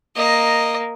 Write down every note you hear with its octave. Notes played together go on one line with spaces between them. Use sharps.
A#3 D#5